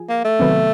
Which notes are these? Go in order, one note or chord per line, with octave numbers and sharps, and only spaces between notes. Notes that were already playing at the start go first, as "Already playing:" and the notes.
Already playing: F3 G#4
A#3
A3
C3 D#3 F#3 B3